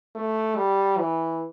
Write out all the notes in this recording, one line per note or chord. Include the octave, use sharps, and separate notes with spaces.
A3
G3
E3